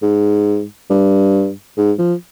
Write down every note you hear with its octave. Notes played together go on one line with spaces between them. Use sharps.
G#2
G2
G#2
F3